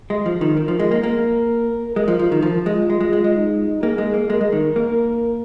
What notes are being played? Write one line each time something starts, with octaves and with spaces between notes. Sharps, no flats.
G#3
F3
D#3
D#3 A#4
F3
G#3
A#3
A#3
G#3 A#4
F3
F3
D#3
F3 F4
G#3
G#3
G#3
G#3
G#3
D#4
A#3 G#4
G#3
A#3
G#3 A#4
G#3
D#3
A#3